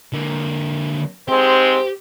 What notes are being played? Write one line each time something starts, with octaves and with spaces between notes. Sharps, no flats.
D3 A#3
G#2 G#3 C4 G4 C5